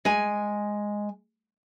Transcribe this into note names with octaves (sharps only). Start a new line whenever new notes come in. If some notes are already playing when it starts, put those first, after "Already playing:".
G#3 G#5